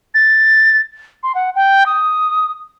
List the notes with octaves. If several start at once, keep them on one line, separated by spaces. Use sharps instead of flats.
A6
C6
F#5
G5
D#6